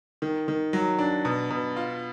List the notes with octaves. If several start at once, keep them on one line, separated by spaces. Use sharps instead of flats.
D#3
D#3
F#3
D4
B2
B2
F4